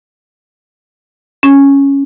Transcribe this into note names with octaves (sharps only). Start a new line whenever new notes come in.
C#4